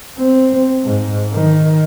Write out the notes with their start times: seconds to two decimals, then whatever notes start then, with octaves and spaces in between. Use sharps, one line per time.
0.18 C4
0.84 G#2
1.34 D#3